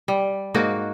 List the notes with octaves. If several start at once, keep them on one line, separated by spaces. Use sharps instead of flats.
G3
G#2 A#3 D#4 F#4